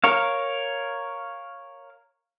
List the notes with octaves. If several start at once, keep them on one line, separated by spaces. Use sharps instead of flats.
A#4 C#5 F5